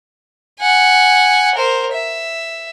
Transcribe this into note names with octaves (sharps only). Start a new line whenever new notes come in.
F#5 G#5
A#4 C5
E5